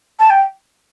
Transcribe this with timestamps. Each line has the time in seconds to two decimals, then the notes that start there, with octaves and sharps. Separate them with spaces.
0.19 A5
0.30 G5